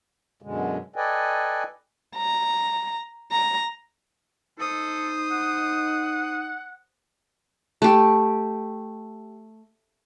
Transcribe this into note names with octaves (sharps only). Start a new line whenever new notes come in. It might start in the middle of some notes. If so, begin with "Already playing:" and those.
F#2 B2 D3 G#3
A4 B4 D5 D#5 G5 G#5
A#5
A#5
D#4 A4 C5 D#6
F#5
A3 G4